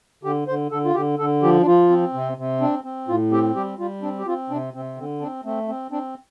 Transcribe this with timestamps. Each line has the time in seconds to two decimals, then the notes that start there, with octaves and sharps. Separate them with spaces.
0.23 D3 G4
0.47 D3 C5
0.71 D3 A4
0.85 F4
0.94 D3 G4
1.18 D3 A4
1.43 F3 G4
1.61 D4
1.66 F3 F4
1.90 C4
2.14 C3
2.38 C3
2.60 C4 D4
2.84 C4
3.08 A2 F4
3.31 C4 G4
3.56 G3 G4
3.79 G3 F4
4.02 C4 D4
4.19 G4
4.27 C4 F4
4.50 C3 D4
4.74 C3 C4
4.97 D3 C4
5.20 C4 D4
5.45 A3 C4
5.68 C4
5.91 C4 D4